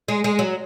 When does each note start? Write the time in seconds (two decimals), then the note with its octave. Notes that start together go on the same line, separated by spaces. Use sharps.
0.08 G#3
0.24 G#3
0.39 F#3